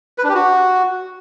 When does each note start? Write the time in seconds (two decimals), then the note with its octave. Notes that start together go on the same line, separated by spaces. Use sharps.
0.18 B4
0.24 D4
0.29 G4
0.35 F#4